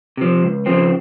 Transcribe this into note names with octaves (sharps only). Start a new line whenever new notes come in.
C3 F3
C#2
C#3 F3 C4